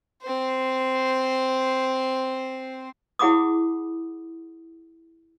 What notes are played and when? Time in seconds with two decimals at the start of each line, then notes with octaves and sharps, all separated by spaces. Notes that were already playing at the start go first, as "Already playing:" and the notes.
0.22 C4 C5
3.19 E4 G#4 F#5 B5 D6 D#6